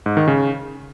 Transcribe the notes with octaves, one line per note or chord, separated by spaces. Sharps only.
G#2
D#3
C#3